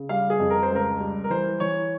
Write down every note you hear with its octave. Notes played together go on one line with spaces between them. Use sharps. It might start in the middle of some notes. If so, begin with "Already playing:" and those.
Already playing: C#3
G3 F5
G#4
F2
A#4
C5
C#2
A#4
G3
A#4
E3 C5
E3 C#5